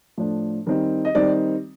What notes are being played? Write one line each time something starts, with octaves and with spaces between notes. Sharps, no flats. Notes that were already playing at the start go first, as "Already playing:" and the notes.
A2 F3 A3 D4
D#3 G3 C4 D#4
D#5
D#3 G3 C4 D#4 D5